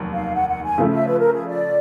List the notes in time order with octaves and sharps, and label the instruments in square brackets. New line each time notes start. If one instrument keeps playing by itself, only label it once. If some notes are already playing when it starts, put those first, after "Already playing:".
Already playing: [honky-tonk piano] F1 D#2 F#3
[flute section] F5
F#5
F#5
G#5
[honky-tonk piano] C#3 F3 A3
[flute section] E5
B4
A#4
G#4
D5